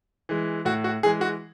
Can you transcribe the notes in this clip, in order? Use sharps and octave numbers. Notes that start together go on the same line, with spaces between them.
E3 G#3
A2 F#4
F#4
E3 G#3 G#4
F#4